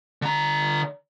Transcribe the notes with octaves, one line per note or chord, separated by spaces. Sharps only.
D3 A#5